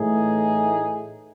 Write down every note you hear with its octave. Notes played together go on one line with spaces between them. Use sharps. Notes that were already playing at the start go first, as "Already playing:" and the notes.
Already playing: A2 E3 A3 D#4 G#4